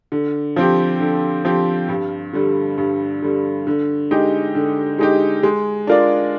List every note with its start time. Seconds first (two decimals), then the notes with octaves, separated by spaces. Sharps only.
0.12 D3
0.56 F3 C4 G4
1.00 D3
1.45 F3 C4 G4
1.88 G2
2.33 D3 G3
2.78 G2
3.22 D3 G3
3.67 D3
4.11 G#3 D#4 G4
4.55 D3
4.99 G#3 D#4 G4
5.43 G#3
5.87 D4 F4 A#4 D5